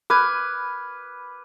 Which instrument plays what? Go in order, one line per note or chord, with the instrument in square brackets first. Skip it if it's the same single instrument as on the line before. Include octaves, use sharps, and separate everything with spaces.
[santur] B4 [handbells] D6 F6 G#6